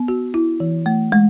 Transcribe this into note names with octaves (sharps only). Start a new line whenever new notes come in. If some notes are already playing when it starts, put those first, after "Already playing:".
Already playing: B3
F#4
E4
E3
A3
G#3